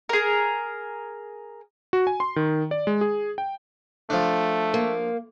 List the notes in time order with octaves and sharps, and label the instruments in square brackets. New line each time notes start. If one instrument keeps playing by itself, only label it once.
[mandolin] G#4 A#4
[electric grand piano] F#4
G#5
C6
D#3
D5
G#3
G#4
G5
[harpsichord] F3 D4 [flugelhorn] A3
[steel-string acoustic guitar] A#3